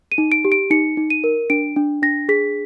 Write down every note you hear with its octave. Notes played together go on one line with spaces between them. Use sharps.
D#7
D#4
D7
G4
D7
D#4 C#7
D#4
D#7
A#4
D4 D7
D4
D4 A#6
G#4 B6